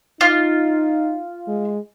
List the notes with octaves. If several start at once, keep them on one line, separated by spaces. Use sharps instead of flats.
D#4 F4
G#3